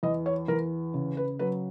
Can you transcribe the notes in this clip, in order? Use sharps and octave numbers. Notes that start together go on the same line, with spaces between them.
E2 D#5
C#5
E2 A#4
C#3
B4
F#3 B4